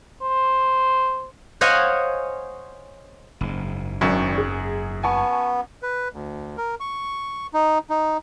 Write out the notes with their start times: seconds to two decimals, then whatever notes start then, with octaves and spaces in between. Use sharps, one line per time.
0.23 C5
1.61 C5 C#5 D#5 F5 F#5 G#5
3.41 F#1 G#2
4.01 G#1 F#2 D4 C#6
4.38 G#4
5.03 B3 G#5 A5 C#6
5.83 B4
6.13 D2
6.57 A#4
6.80 C#6
7.54 D#4
7.90 D#4